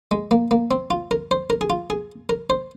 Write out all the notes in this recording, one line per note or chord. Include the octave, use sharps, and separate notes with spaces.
G#3
A#3
A#3
C4
F4
A#4
C5
A#4
G#4
F4
G#4
A#4
C5